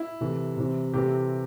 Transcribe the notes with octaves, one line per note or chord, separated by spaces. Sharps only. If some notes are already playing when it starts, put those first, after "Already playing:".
Already playing: E4
C3 E3 A3
C3 E3 C4
C3 E3 A3 C4 G4